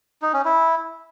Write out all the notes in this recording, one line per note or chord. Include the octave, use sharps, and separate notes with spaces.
D#4
C#4
E4